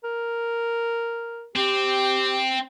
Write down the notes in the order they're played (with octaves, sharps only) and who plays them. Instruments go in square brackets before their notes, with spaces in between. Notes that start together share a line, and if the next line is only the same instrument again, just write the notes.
[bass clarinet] A#4
[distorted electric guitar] C4 [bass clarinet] G4